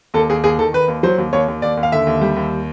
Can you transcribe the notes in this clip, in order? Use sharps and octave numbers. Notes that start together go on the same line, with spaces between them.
D#2 A4
D#2 G#4
D#2 G#4
D#3 A4
D#3 B4
D#2
F#3 C5
D#2
D#2 C#5
D#2
D#2 D5
D#2
F5
D3 E5
D#2
G3
D#2